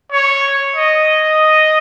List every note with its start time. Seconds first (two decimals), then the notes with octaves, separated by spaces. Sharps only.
0.12 C#5
0.76 D#5